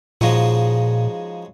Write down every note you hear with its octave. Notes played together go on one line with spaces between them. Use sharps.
A#2 C#3 F3 G#3 D#4 F#4